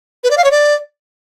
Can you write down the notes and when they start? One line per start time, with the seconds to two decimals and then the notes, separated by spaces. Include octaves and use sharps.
0.24 B4
0.31 D5
0.37 F5
0.44 C#5
0.51 D5